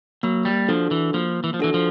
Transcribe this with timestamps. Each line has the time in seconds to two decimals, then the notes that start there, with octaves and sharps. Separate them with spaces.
0.23 F#3 A#3
0.45 G3
0.68 F3 D4 F#4 A4
0.91 E3
1.14 F3 A#3
1.44 E3
1.54 F3
1.59 E3 D4 F#4 A4
1.74 F3